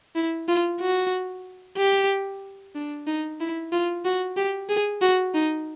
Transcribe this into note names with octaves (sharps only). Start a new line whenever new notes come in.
E4
F4
F#4
G4
D4
D#4
E4
F4
F#4
G4
G#4
F#4
D#4